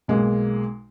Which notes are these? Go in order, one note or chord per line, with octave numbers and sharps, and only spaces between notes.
B1 G#3 A#3